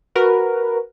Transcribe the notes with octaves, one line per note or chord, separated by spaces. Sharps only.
F#4 A#4 B4